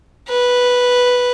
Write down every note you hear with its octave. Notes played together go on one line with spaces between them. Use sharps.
B4